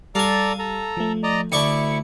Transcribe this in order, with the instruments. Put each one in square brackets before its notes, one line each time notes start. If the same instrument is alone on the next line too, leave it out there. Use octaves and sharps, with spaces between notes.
[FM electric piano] G3 [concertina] A4 D5 A#5 [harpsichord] F5 G#5
[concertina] A4 A#5
[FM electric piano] F3 A3
[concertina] D5 D#5 A#5
[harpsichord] D2 D5 C#6 [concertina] E4 [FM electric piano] A4 C#7